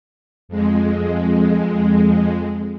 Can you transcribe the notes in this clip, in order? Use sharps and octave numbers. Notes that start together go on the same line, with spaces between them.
F2 G#3